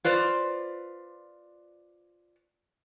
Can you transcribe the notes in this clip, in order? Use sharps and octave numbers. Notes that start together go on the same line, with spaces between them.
F4 B4 C5 D5